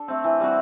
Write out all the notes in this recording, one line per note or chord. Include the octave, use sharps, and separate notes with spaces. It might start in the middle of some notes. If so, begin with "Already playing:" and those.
Already playing: D4 A4
A3 C4
E3
G3 C4 F#4